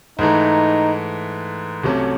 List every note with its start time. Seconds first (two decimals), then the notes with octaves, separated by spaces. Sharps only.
0.19 G#2 E3 A3 D#4
1.83 C2 C3 F#3 A3 C#4